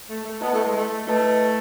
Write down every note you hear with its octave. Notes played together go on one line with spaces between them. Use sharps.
A3
A3
B3 E4 B4 D#5 A5
A3
G#3
A3
A3 E4 B4 D#5 A5